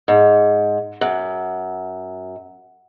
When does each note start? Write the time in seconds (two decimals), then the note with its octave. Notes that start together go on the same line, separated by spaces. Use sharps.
0.08 G#2
1.01 F#2